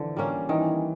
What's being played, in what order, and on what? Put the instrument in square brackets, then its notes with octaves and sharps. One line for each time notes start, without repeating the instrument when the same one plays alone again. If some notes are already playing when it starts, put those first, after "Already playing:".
Already playing: [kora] D3 [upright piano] E3 F3
[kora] G3 A#3 C#4
[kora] D#3 [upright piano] E3